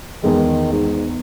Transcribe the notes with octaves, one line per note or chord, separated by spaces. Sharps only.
E2 D#3 G#3
G#2